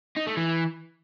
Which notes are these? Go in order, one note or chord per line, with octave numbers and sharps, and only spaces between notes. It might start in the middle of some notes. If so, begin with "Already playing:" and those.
D#4
A3
E3